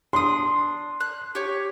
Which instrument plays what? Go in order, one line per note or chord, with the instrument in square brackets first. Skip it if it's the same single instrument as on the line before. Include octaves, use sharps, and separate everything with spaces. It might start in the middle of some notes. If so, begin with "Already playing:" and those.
[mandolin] D4 D#6 [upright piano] C6
[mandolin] F#6
G4 C#5